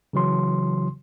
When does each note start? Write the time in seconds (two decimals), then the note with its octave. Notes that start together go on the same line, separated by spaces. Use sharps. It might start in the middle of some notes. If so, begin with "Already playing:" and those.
0.13 C#3 E3 F#3 C6